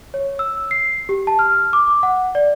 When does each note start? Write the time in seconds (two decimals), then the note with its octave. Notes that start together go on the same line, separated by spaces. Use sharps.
0.14 C#5
0.39 E6
0.71 C7
1.09 G4
1.27 A5
1.39 F6
1.73 D6
2.03 F#5
2.35 D5